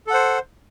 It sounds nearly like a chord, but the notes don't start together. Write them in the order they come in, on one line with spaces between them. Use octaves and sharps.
A4 F#5 C5